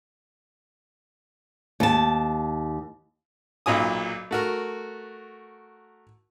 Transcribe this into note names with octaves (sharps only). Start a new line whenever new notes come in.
D#2 A5
B1 A#2 F#3 G#5 D#6
A3 F#4 A#4